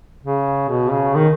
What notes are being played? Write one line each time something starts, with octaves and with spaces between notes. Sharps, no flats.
C#3
B2
C#3
D#3